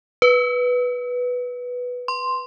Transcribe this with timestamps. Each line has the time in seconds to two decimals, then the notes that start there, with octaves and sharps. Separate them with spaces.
0.22 B4
2.08 C6